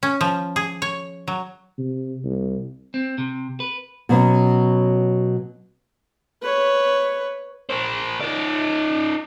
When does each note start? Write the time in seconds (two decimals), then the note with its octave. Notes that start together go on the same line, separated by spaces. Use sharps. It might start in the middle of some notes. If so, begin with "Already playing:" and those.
0.03 C#4
0.21 F3
0.56 G#4
0.82 C#5
1.28 F#3
1.78 C3
2.24 C2
2.94 C4
3.18 C3
3.60 B4
4.09 B2 F#3 B3 C#4
6.42 B4 C#5
7.70 A#4 C5
8.21 D#4 D5